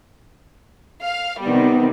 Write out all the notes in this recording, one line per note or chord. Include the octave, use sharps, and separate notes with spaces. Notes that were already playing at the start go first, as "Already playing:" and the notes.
F5
C3 D#3 G3 B3